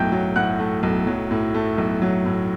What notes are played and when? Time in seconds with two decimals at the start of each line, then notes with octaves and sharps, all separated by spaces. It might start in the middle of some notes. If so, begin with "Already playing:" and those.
Already playing: B1 A2 A3 G5 G6
0.12 F#3
0.36 A2 F#5 F#6
0.60 A3
0.83 B1
1.07 F#3
1.31 A2
1.54 A3
1.78 B1
2.02 F#3
2.25 A2